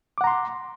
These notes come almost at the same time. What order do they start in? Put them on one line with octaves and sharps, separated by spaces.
D6 F#5 A#5 C6